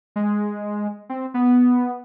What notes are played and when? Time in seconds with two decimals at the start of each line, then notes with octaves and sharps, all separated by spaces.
0.16 G#3
1.09 C4
1.34 B3